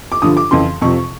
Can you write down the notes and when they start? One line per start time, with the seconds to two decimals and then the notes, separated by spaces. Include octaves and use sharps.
0.12 D6
0.22 G2 D3 F3 D#6
0.37 D6
0.51 F2 C#3 E3 C6
0.81 F2 C3 F3 C#6